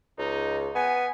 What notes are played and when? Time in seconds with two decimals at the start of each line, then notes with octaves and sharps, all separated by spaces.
0.18 C#2 D#4
0.75 B3 G#5